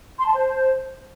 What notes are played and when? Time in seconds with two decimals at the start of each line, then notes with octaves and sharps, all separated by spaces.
0.19 C6
0.26 A5
0.34 C5